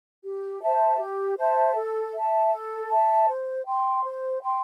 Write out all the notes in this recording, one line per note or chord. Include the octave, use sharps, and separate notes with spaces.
G4
C5 E5 A5
G4
C5 E5 A5
A4
E5 A5
A4
E5 A5
C5
G5 C6
C5
G5 C6